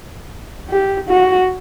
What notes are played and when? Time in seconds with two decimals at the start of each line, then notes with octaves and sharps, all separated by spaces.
0.70 G4
1.09 F#4